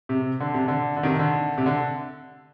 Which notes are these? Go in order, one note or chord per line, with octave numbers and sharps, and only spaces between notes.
C3
D3
C3
D3
D3
C3 D#3
D3
C3
D3